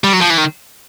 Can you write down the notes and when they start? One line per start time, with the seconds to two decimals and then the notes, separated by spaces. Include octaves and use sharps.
0.04 G3
0.13 F#3
0.21 F3
0.30 E3
0.38 D#3